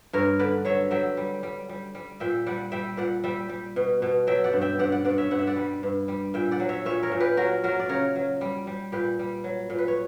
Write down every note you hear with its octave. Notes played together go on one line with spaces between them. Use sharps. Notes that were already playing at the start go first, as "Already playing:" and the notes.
G2 A#4 C#5
D3 B4 D5
F#3 C#5 E5
F#3 E5 G5
G3
G3
G3
G3
A#2 E5 G5
G3 D5 F#5
G3 E5 G5
A#2 D5 F#5
G3 E5 G5
G3
B2
B2
F#3 E5 G5
D5 F#5
G2
E5 G5
G2 D5 F#5
D5 F#5
G2 D5 F#5
C#5 E5
G2 F#5
E5
D5 F#5
G3
G2
G3
A#2 E5 G5
D5 F#5
F#3
C#5 E5
A#2 C#5 E5
A#4 C#5
A#2
G4 B4
F#3 F#4 A#4
F#3 F#4 A#4
D5
C#3 A#4 C#5
F#3
G3
G3
A#2 G4 B4
G3
F#3
A#2
B4
C#5